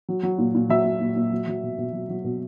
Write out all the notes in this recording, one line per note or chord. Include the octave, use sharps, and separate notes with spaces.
F#3
F#3
A#2
A#2
F#3 E5
F#3
A#2
A#2
F#3
F#3
B2
B2
F#3
F#3
B2